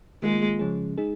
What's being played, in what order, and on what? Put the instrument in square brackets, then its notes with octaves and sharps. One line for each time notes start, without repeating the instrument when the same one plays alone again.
[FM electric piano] D#3 A#3 F4 G#4 [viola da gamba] G#3
[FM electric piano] C#3 F3 C#4 G#4
G#3 D#4 G#4